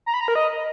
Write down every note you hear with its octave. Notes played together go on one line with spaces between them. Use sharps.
A#5
B5
A#5
A#4
D#5